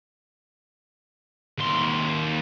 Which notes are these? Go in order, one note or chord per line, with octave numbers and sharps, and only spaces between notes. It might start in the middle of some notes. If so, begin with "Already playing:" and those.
D#2 C6